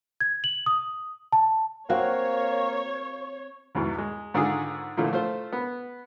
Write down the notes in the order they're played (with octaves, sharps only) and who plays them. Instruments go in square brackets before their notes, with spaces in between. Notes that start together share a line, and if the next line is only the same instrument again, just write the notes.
[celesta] G#6
F#7
D#6
A5
[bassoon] A#3 [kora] C4 F#4 [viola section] C#5 [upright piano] F5
[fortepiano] E2 G#2 B2 E3
G#3
G#2 D3 D#3 F4 G#4
A#2 D3 E3 F3 A3
A3 F4 C5
B3